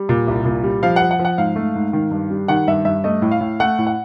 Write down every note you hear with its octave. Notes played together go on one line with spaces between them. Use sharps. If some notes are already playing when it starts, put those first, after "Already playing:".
Already playing: G3
A#2
C2
A#2
G3
F3 F5
F#5
F3
F#5
F3
F#5
G#2 F5
A3
G#2
D#3
G2
G3
D#3 F#5
G2 E5
G2 E5
A3 D#5
A2
F5
A2
A3 F#5
A2
F#5